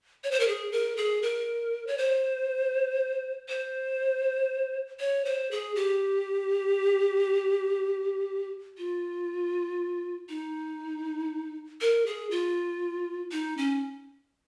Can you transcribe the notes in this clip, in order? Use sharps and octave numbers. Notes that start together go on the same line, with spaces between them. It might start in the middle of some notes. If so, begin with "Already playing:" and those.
C#5
C5
A#4
G#4
A#4
G#4
A#4
C#5
C5
C5
C#5
C5
G#4
G4
F4
D#4
A#4
G#4
F4
D#4
C#4